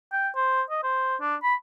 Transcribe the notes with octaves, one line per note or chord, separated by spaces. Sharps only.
G5
C5
D#5
C5
D4
B5